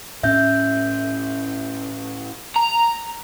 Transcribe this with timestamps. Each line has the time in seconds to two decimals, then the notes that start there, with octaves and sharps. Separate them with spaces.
0.23 A2 C#4 E5 G6
2.56 A#5